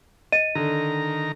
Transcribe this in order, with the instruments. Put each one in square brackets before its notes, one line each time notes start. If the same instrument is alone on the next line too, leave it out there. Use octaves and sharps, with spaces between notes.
[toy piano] D#5 [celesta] D#7
[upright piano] D3 [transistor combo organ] D#3 A#5